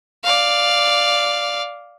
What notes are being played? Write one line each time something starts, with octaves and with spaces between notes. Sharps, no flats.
D5 F5